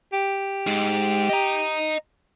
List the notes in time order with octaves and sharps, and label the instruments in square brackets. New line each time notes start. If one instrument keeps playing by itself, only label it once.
[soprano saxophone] G4
[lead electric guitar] G#2 G#3
D#5 A#5